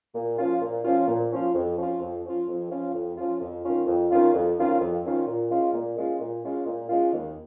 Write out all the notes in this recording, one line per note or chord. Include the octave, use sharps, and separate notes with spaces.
A#2
F3 C#4 F4
A#2
F3 C#4 F4
A#2
F3 C#4 F4
F2
F3 C#4 F4
F2
F3 C#4 F4
F2
F3 C#4 F4
F2
F3 C#4 F4
F2
D#3 C#4 F4
F2
D#3 C#4 F4
F2
D#3 C#4 F4
F2
D#3 C#4 F4
A#2
G#3 C#4 F4
A#2
G#3 C#4 F4
A#2
G#3 C#4 F4
A#2
G#3 C#4 F4
D#2